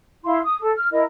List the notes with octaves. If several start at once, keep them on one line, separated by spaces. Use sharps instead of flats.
E4 F5 C6
D#6
A4
F6
E4 A#4 D#5